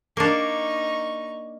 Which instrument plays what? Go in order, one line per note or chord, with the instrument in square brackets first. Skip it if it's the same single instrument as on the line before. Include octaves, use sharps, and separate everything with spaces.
[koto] A#3 D4 [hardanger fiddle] D#4 C#6